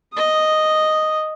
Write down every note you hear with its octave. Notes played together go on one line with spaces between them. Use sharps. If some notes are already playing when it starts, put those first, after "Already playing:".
D#5 D#6